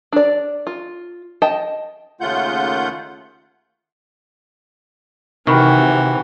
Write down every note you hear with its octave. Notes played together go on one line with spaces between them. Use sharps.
D4 D5
F4
D#5 G5 A5
D#2 C#3 A3 F4 F#5 G6
C3 D#3 E3 F#4 G5 B5 C#6